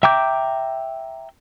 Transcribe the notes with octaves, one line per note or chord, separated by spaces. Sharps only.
E5 G5 A#5 D6 G6